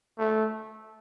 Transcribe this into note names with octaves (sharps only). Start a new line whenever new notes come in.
A3